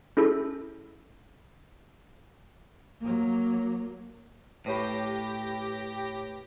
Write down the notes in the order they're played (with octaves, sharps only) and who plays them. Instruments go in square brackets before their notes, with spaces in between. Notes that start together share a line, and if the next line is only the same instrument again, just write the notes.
[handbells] C#4 E4 G#4 A4
[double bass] F#3 A#3
[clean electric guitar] A2 [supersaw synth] G4 A#6 [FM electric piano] B4 C#5 B5